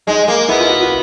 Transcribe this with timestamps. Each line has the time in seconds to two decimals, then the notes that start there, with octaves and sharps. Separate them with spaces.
0.07 G#3 D#4
0.28 A#3
0.48 B3 E4
0.59 F4
0.69 F#4
0.81 F4